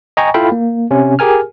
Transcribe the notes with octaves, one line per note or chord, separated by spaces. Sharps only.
D#5 G5 G#5 A#5 C#6
E4 F4 A4 F5 G5 B5
A#3
C3 C#4
G4 G#4 A#4 G#5 F6